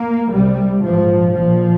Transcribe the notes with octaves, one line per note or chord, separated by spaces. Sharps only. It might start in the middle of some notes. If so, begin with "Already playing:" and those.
Already playing: A#3
C2 C3 G3
A#1 G#2 F3
A#1 A#2 F3